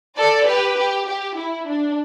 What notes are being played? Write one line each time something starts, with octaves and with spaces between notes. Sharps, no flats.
A4 D5
G4 B4
G4
G4
E4
D4